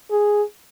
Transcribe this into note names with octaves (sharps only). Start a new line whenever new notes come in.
G#4